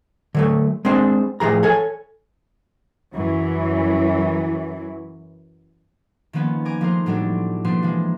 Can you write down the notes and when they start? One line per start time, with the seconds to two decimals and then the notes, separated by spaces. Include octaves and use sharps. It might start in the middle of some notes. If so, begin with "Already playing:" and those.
0.35 D3 F#3 A3
0.85 G#3 C4 D4 C5
1.40 A2 F3 G#4 A#5
1.63 A4 C#5 G#5
3.14 F#2 E3 F#3
6.33 D#3 F3 A#3 B3 C#4
6.65 A#4 G#5 D6 A#6
6.81 F3 G#3 A3 D#4 A#4 C5
7.06 A2 F#3 G3 A3 C4 D4
7.64 B2 F3 G3 A#3 D4 C6
7.83 E3 F3 G#3